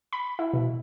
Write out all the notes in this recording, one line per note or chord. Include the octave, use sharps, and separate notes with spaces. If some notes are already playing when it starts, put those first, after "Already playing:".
B5
E4
B2